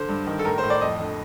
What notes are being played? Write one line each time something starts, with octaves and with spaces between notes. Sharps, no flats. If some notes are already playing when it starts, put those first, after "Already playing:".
Already playing: D3 C5
G2
D#3
A4
A2 A#4
C5
A2
D5
F2 D#5
D3